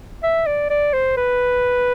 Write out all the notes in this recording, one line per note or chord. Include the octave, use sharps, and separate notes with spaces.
E5
D5
D5
C5
B4